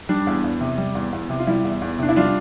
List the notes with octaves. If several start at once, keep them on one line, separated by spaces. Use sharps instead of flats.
G3 D4
E2
E2
C3
G3
E2
E2
C3
F4
G3 E4
E2
E2
C3 D4
E4
G3 D4 F4